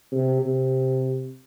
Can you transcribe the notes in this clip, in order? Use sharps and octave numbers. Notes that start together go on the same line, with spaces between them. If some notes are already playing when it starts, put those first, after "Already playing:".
C3
C3